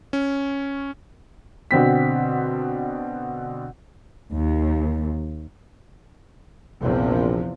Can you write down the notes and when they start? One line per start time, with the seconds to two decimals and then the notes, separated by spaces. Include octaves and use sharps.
0.13 C#4
1.71 B2 D3 C4 B6
4.33 D#2
6.81 A#1 E2 C3 F3